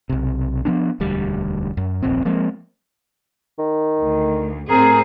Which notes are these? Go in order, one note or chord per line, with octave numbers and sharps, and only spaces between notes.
B1 C3
F3 B3 D4
E1 D2 G3
F#2
D#1 A#1 F2 C4
F3 G#3 A#3 C4
D#3
D2
A2 C4 G#4 A#4